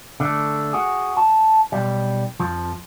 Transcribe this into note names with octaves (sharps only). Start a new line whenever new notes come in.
D3 A3
F#4 G#4
A5
B1 G3
F2 F3